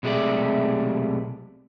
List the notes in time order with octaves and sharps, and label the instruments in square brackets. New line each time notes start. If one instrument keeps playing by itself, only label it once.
[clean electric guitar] B1 C3 G#3 A3 G4 D5